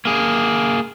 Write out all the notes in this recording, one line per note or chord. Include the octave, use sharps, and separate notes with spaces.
A#3 G#4